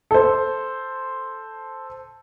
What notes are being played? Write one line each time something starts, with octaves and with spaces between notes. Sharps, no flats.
A4 C5